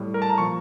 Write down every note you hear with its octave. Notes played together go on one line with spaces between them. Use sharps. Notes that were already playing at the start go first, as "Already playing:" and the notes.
Already playing: A2 G3
A#4
A5
A#5
A#2 F3 C#6